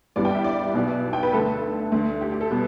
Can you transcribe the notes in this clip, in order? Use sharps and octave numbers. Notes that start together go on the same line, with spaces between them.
G1 G2 E3 G3 B3 D5
G5
E5
D5
B1 B2 B3
G5
B4
D2 D3 A3 A4
D2 D3 A3
G4
G4
A4
B2 G3 B3